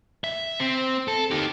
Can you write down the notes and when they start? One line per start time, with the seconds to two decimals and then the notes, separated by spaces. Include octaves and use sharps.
0.24 E5
0.60 C4
1.08 A4
1.31 D#4 G4